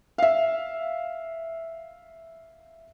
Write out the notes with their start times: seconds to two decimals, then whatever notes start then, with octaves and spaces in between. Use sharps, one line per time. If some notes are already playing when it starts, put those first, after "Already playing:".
0.18 E5 F5